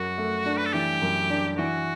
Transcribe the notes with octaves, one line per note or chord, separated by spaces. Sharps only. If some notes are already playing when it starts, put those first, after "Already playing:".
Already playing: F#2 F#4
A3
D4
B4
A4
E3 G4
F#2
D4
E3 F#4